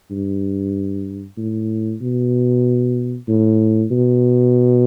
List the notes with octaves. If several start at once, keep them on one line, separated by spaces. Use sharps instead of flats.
G2
A2
B2
A2
B2